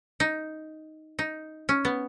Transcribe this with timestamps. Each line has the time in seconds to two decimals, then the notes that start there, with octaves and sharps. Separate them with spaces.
0.20 D#4
1.19 D#4
1.69 C#4
1.85 B3